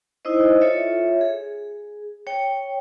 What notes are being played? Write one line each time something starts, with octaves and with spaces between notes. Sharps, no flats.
D#4 E4 C5 D#5
F4 A4 C#5 E5
G#4
C#5 G5